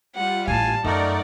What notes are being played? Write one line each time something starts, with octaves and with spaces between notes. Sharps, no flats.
G3 F4 F#5
A1 A2 F5 G#5 A5
F#2 A3 D#4 A#4 D5 F#5